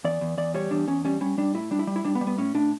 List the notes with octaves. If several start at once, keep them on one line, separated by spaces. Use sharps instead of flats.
E2 D5
E2
E2 D5
G3 C#5
E2 D4
E2 C#4
G3 C#4
G3 C#4
G3 D4
A2 E4
G3 D4
E4
G3
E4
G3 D4
B3
G3
B3
A2 C#4
A2 D4